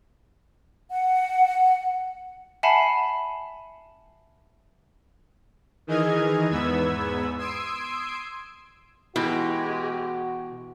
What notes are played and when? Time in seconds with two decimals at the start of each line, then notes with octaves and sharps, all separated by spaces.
0.91 F#5
2.63 E5 F#5 G#5 A5 B5 C7
5.87 D#3 E3 G#4 D#5 F6 G#6
6.50 E2 G#2 B3 B5 E6 G#6
7.38 C6 D#6 E6 G#6 C7 D7
9.16 B2 E3 G#3 F#4 G4